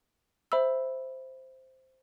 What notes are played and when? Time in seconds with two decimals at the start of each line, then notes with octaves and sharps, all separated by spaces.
0.52 C5 E5 B5 E6